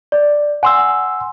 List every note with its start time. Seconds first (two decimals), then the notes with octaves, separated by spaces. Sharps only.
0.12 D5
0.63 F#5 G#5 C6 E6